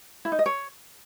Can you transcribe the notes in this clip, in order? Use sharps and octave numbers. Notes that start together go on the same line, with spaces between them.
E4
D#4
D#5
C#5